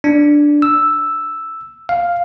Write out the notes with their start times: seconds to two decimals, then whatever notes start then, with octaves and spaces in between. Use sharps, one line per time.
0.04 D4
0.62 E6
1.89 F5